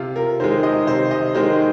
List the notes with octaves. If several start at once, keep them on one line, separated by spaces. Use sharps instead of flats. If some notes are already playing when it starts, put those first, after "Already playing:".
Already playing: C3 F4
A#4
D#3 G#3 C5
D#5
C3 C5
D#5
D#3 G#3 C5